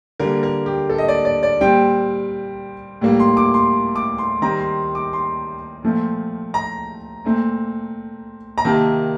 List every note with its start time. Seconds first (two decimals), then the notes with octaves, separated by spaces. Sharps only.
0.20 D3 G3 A#3 A#4
0.43 A#4
0.66 G4
0.90 A4
0.98 D#5
1.08 D5
1.25 D5
1.43 D5
1.61 A#2 G3 C4 G5
3.01 A2 G3 A#3
3.20 C6
3.37 D6
3.54 C6
3.96 D6
4.18 C6
4.42 D#3 G3 C4 A#5
4.60 C6
4.95 D6
5.13 C6
5.83 A#2 F3 A3 C4
6.54 A#5
7.25 A#2 A3 C4
8.58 A#5
8.65 C3 D#3 A#3 A5